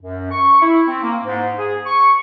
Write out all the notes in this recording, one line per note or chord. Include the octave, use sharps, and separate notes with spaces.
F#2
C#6
E4
C4
A#3
G#2
G#4
C#6